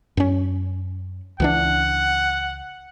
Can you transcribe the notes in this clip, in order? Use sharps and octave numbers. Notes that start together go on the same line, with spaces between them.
F#2 C#4
C#2 E3 D4 F#5